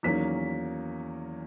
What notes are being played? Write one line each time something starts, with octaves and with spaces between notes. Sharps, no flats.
E2 D#3 F#3 A#3 C#4 B6